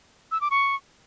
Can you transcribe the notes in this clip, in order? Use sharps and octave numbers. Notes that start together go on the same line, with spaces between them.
E6
D6
C#6